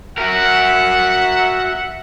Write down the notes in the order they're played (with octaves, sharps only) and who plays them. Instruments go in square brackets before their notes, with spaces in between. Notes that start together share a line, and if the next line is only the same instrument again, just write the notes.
[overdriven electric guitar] F#4 A#4 [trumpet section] E5 F#5